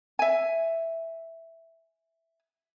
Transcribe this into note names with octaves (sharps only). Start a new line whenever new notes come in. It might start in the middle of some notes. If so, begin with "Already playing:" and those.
E5 G#5